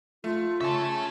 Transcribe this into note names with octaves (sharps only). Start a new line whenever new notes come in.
A3 F4
C#3 E5 G#5 A5 C#6 E7